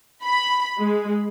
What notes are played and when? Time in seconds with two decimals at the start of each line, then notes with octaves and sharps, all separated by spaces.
0.24 B5
0.78 G#3